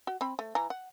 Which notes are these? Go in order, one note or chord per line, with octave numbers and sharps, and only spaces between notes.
F#4
C4 B5
A3
E3 A#5
F#5